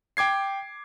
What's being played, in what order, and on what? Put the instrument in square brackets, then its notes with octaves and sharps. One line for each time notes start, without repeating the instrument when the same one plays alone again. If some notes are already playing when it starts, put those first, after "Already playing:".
[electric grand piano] G5 D6 G#6 C7